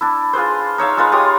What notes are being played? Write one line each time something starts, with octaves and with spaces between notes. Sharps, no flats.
D4 E4
F4 G#4 B4 C5
D#4 C#5 E5 F5
G#3 F4 B4 A#5
F4 G4 C#5 D#6